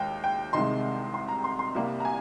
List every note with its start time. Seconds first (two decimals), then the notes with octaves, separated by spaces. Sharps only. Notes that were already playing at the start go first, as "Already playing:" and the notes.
Already playing: D#2 G#3 F5 G5
0.24 G5
0.53 C2 C3 D#3 G#3 C6
1.14 C6
1.28 A#5
1.44 C6
1.59 C6
1.74 C2 C3 G3 A#3
2.00 A#5
2.05 G#5